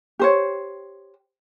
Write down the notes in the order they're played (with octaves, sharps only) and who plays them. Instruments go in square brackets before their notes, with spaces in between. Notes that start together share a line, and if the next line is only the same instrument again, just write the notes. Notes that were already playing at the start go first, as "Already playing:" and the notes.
[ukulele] G4 C5 C#5